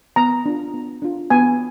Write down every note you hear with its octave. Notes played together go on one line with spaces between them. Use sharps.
B3 A#5
D4 F4
B3
D4 F4
B3 G#5